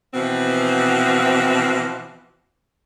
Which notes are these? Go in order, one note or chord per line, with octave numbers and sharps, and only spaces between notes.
B2 E3 F3 C4